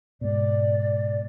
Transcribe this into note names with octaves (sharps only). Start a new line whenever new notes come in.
G#2 B2 D5